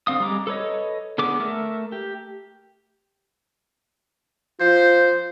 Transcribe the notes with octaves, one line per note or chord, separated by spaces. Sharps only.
D3 C4 F5 D#6
G3 G#3 A#5 D6
A4 B4 C#5 D#5
D3 B3 G#4 D6
A3 A#4 E5
G4
F3 F4 C5